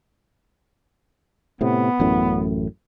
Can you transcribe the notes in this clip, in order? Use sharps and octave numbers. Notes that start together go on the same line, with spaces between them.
A2 C3 B3
A1 F#2 A2